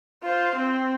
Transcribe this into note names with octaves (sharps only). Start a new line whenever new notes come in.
F4 C5
C4